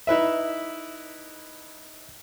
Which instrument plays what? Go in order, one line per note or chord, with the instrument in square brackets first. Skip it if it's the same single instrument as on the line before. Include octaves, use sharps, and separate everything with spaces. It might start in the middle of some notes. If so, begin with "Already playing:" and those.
[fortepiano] D#4 E4 B4 E5